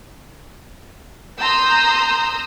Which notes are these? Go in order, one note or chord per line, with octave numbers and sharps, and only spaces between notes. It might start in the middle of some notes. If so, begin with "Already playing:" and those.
A#5 C6 D#6 E6 G6